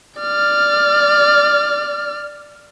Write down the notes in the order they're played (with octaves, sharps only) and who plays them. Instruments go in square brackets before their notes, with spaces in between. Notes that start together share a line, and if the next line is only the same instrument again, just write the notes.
[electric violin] D5 F6